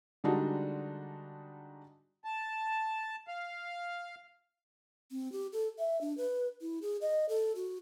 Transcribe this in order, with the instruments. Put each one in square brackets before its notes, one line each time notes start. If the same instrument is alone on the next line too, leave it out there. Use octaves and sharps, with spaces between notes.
[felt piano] D3 G3 G#3 D4 D#4 F#4
[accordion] A5
F5
[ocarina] C4
G4
A4
E5
D4
B4
E4
G#4
D#5
A4
F#4